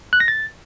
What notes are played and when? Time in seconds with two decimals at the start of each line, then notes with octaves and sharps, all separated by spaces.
0.13 F#6
0.20 A#6
0.28 A6